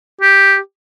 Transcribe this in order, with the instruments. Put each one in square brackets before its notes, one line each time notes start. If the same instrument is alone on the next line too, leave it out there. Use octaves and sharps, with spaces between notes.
[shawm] G4